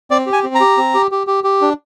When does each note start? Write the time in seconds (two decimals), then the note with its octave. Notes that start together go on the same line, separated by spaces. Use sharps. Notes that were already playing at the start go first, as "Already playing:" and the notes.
0.11 C4 D5
0.26 G4
0.33 G#5
0.43 C4
0.55 A#5
0.60 G4
0.77 C4
0.94 G4
1.11 G4
1.27 G4
1.44 G4
1.61 D4